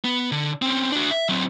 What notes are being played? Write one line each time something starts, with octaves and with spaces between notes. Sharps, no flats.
B3
D3
C4 C#4
D4 F#4
E5
F#3 C4